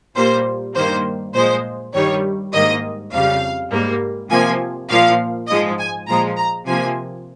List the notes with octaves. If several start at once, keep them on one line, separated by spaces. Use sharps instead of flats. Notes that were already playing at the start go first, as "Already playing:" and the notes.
A#2 G3 A#3 C5
G2 D#3 A#3 C5
A#2 F3 G#3 C5
G2 D#3 G3 C#5
G#2 D#3 A#3 D#5
F2 C#3 G3 F5
G#2 G3 A#3
C3 F3 A#3 G#5
A#2 F3 A#3 F5
G#2 F3 G#3 D#5
G#5
A#2 F3 G#3 A#5
A#5
C3 F3 A#3 G#5